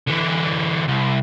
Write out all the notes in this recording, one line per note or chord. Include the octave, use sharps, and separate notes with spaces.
D3 E3
C2